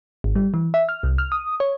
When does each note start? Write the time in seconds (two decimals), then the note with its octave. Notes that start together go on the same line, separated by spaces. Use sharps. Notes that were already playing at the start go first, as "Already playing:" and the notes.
0.24 G#1
0.35 G3
0.54 E3
0.74 E5
0.89 F6
1.03 C2
1.18 F6
1.32 D#6
1.60 C#5